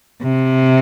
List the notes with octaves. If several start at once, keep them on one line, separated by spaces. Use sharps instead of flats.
C3